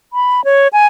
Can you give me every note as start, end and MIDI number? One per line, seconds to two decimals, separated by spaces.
0.13 0.44 83
0.45 0.68 73
0.73 0.87 80